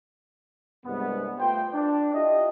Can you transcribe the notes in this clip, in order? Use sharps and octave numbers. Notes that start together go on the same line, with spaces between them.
C2 G2 G#3 B3
A3 F4 B4 C5 G5
D4
E4 F4 G4 D#5